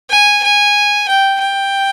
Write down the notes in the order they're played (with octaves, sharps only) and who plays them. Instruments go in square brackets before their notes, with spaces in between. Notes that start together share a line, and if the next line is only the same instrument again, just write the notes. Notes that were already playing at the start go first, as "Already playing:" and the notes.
[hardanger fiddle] G#5
G#5
G5
G5